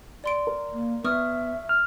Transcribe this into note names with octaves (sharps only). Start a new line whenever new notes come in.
D5 C6 D7
A#4
A#3
B3 E5 C#6 D#6 F6
F6